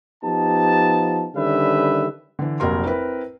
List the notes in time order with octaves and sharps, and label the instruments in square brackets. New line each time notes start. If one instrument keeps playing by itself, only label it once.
[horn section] F3 B3 D#4 G4 A5
D3 D#3 G3 C#4 B4 E5
[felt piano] D3 E3
F1 A#1 F#3 A#4 C6
C4 E4 A#4 B4